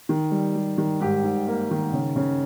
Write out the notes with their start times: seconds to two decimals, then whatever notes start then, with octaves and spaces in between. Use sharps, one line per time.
0.09 D#3
0.31 G3
0.55 G3
0.78 D#3
1.01 G#2 G4
1.24 G#2
1.48 A#3
1.71 D#3
1.93 C#3
2.16 C#3